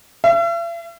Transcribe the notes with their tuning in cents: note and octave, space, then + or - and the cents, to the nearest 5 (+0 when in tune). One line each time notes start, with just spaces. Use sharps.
E5 +45